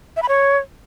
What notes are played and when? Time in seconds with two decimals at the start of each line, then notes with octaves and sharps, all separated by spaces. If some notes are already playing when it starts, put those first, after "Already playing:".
0.17 E5
0.23 B5
0.29 C#5